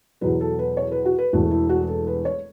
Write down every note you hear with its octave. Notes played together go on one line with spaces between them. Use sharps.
E2 B2 F#3 B4
A4
B4
C#5
B4
F#4
B4
E1 E2 E3 A3 F#4
E4
F#4
A4
B4
C#5